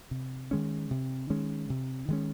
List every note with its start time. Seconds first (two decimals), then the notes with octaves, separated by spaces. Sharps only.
0.11 C3
0.51 D#3 G#3 C#4
0.91 C3
1.30 D#3 G#3 C#4
1.70 C3
2.08 D#3 G#3 C#4